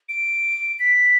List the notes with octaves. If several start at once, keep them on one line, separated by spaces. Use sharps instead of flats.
D7
B6